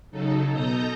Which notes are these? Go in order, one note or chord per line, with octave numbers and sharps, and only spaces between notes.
C#3 F#3 D#4 A4
B2 A4 D#5 A#5 G6 A#6